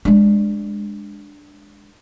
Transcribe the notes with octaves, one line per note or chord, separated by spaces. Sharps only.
G#3 D4